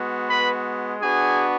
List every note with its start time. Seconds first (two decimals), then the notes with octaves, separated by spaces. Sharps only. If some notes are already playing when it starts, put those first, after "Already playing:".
Already playing: G#3 B3 F#4
0.30 B4 B5
1.02 B3 D4 F#4 G#4 G#5